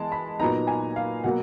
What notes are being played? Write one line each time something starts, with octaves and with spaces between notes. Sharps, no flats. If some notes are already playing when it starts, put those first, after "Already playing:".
Already playing: E3 G#3 B3 A5
B5
A#2 F#3 B3 D#4 A#5
G#5
F5
B2 F#3 A#3 F#5